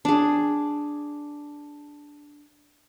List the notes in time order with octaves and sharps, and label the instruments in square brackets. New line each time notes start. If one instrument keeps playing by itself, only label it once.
[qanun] D4 G#4